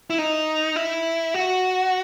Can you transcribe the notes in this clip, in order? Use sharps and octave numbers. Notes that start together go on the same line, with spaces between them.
E4
D#4
E4
F#4